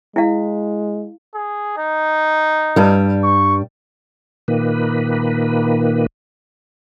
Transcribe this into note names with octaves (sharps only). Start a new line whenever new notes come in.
G#3 E4 F5
G#4
D#4
G2 G3
C#6
A#2 D#3 A#3 B4